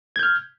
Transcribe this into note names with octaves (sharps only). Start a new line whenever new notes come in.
F6 G6 G#6